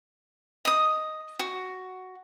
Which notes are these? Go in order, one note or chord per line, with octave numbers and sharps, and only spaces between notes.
D#5 D#6
F#4